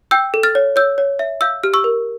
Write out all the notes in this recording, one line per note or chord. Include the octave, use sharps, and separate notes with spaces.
G5 E6 G6
A4
F6 A6
C#5
C#5 E6 G6
C#5
E5
F5 E6 G6
G4 F6
C#6 E6
A#4